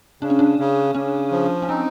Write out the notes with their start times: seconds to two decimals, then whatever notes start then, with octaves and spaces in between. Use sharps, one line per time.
0.21 C#3 D4
0.30 C#4
0.39 D4
0.59 C#3
0.95 C#3 C#4
1.31 F3
1.62 C#4
1.69 C4 D#4